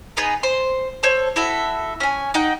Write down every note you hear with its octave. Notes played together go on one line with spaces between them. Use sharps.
B3 D#4 G#4 B4
C5 C6
A4 C5 C#5
E4 F#4 A4 E5
C#4 G#5
D#4 F#5 G5